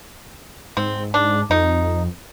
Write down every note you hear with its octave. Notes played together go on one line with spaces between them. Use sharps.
G#2 C4
D4
F2 D#4